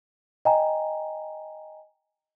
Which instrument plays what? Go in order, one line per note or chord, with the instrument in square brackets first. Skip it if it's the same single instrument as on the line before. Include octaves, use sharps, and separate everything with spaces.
[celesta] D#5 G5 G#5 A#5